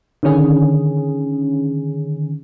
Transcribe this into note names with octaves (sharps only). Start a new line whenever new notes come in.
D3 D#3 C#4 G#4